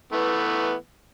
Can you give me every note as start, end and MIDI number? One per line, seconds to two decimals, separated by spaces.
0.13 0.74 52
0.13 0.74 57
0.13 0.74 59